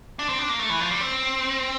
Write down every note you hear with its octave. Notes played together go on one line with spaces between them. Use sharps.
D4
C4
D4
A#3
A3
E3
F3
G3
C4